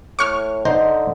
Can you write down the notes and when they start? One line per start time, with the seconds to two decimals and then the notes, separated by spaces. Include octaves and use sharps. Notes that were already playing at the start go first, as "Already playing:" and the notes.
0.19 A2 C#6 F6
0.65 D3 D#4 C5 D#5